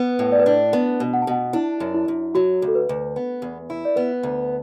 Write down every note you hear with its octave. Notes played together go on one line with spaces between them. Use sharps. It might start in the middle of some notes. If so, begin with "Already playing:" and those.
Already playing: B3 B4
A2
D5
B4
D4 D5
B3
B2
F#5
A5
B2 F#5
D4 E4
F#2
E4
F#2
F#3 F#4
D2
A4
B4
D2
B3
E2
E4
D5
B3 B4
D2